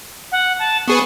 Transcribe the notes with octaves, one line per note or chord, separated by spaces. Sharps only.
F#5
A5
B3 G#4 B4 C#6